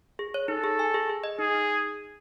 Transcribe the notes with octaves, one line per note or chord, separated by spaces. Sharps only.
G#4
C#5
D#4 A4
G#4
G#5
G#4
G#4
D#5
D#4 G#4
D#4